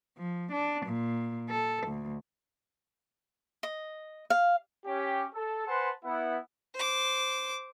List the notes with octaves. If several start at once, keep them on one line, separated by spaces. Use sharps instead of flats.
F3
D4
A#2
A4
D2
D#5
F5
C#4 G4
A4
B4 C5 F#5 G#5 A5 C6
B3 E4 F#5
C5 D6